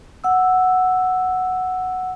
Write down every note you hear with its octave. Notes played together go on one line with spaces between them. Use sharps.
F#5 E6